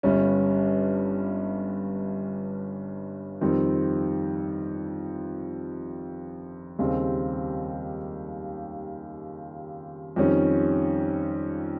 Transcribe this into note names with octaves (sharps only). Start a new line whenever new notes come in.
G1 G2 G3 C#4
F2 D#3 G3 C4
D#2 C#3 G3 C4
F2 D#3 G3 C#4